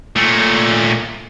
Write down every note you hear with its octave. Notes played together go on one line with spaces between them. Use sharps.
A#2 A3